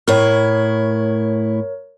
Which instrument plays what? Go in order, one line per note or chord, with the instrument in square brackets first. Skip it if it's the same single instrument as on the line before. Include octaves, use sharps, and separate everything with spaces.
[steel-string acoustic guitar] A2 E4 [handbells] A#4 C#5